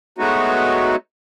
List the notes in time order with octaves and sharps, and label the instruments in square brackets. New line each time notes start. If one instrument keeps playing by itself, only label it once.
[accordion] F#3 G#3 A3 B3 D#4 F#4